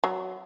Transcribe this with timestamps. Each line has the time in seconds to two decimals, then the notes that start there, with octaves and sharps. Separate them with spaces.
0.04 F#3